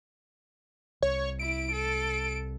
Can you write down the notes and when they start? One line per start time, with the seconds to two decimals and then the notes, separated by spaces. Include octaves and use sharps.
1.03 C2 C#5
1.39 E4 D7
1.72 A4